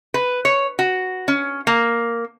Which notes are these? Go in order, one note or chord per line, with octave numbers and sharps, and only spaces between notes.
B4
C#5
F#4
C#4
A#3